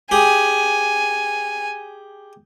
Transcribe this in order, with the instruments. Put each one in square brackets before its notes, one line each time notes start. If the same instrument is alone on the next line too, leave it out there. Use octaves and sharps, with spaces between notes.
[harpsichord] G4 G#4 [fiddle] G#5